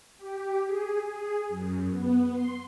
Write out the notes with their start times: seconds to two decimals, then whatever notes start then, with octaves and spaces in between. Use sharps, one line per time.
0.18 G4
0.65 G#4
1.09 G#4
1.49 F#2
1.90 B3
2.33 C6